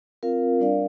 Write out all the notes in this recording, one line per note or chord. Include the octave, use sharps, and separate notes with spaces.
C4 F4 A#4 F5
G3 D4 A#4 D5 F5